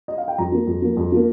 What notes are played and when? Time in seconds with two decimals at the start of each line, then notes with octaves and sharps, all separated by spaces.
0.08 D#5
0.18 F5
0.28 G5
0.38 F2 A#5
0.52 F3 A#3
0.67 F2
0.82 F3 A#3
0.97 F2
1.12 F3 A#3